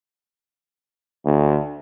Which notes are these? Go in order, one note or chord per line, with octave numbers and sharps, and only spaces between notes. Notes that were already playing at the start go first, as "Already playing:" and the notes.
D2